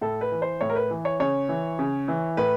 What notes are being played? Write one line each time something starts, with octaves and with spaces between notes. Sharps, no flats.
A2 A4
B4
E3
C5
A2 C#5
A#4
B4
E3
C#5
C#3 C#5
E3
C#3
E3
A2 B4